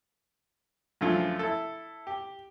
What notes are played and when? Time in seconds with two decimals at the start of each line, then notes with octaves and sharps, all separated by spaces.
1.01 F#2 D3 F3 A3 F4
1.39 E4 A4
2.07 G4